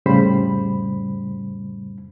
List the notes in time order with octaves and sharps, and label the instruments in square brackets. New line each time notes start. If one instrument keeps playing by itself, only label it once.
[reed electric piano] F2 A2 C#3 G3 C5 B5